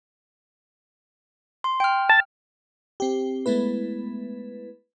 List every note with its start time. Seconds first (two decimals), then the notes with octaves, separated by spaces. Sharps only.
1.64 C6
1.80 G5 F6
2.09 A5
3.00 C4 G4
3.46 G#3 A3 B3 E4 B4